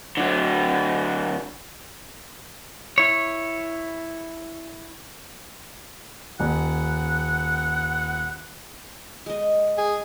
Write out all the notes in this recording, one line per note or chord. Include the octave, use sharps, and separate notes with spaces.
D3 F#3
E4 C#5
D#1 F#5
G#3 D#5
G#4